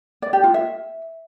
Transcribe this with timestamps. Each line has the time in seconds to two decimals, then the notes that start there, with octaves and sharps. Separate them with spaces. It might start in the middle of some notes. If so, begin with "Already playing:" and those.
0.22 D5
0.33 G4
0.44 F4
0.54 E5